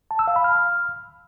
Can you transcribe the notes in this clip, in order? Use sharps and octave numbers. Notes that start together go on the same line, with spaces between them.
A5
E6
F5
B5
F6